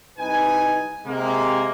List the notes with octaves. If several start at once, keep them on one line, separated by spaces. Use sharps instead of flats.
C2 D#4 B4 G#5
C3 G#3 A#3